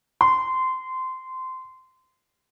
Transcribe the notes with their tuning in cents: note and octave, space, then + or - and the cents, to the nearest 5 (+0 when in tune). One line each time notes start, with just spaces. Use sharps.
C6 -20